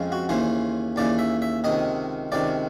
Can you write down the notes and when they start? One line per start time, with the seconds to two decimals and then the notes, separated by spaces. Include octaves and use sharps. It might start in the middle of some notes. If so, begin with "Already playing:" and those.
Already playing: F2 C#3 F3 G#3 C4
0.12 F#4
0.29 D#2 C#3 E3 C5
0.96 D#2 C#3 E3 D5
1.19 E5
1.42 E5
1.64 C#2 C3 D#3 D#5
2.32 C#2 C3 D#3 D5